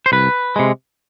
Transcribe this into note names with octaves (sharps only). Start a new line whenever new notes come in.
C5
C2 B4
C3 G#3